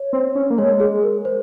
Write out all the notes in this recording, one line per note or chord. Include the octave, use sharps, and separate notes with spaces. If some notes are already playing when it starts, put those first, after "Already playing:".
Already playing: C#5
C4
C#4
A#3
G#3 C#5
G#4
A#4
C5